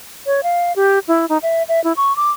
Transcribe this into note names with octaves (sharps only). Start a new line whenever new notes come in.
C#5
F5
G4
E4
D#4
E5
E5
E4
C#6
D6